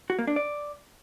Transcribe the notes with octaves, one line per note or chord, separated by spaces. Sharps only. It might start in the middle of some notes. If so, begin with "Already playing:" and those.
F#4
A#3
D4
D5